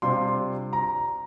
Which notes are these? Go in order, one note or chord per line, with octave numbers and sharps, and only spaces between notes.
C3 G3 D4 F4 C6
A#5